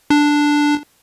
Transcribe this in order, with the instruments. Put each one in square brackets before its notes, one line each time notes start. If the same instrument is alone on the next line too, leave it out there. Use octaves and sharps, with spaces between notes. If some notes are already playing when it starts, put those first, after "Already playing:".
[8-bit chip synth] D4